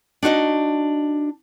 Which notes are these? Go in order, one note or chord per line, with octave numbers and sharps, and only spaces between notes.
D4 D#4 F#4 D#5